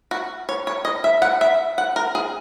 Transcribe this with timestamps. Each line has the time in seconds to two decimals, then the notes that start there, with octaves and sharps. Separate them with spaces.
0.11 F#4
0.49 C#5
0.67 C#5
0.85 D#5
1.04 E5
1.22 F#5
1.41 E5
1.78 F#5
1.96 A#4
2.15 G#4